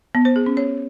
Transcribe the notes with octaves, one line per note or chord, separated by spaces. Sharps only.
B3
C5
G#4
C#4
C#5